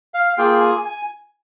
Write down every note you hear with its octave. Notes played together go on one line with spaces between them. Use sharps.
F5
F5
A#3 F4 G#4 G5
G#5
G#5